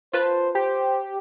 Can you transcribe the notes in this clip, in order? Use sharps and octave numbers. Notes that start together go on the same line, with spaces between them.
F4 B4 C5 A5
G4 C5